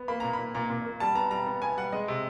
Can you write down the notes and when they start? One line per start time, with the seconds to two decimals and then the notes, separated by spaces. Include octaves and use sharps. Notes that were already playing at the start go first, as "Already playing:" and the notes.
Already playing: B3
0.08 A#3 B5
0.20 A#2 A#5
0.33 B5
0.39 A#2
0.55 A#2 A#5
0.70 A#2
0.85 A#3
1.00 G3 A5
1.15 B3 A#5
1.31 G3 A#5
1.47 B3
1.62 B3 G#5
1.77 G3 F#5
1.92 G#3 D#5
2.08 C3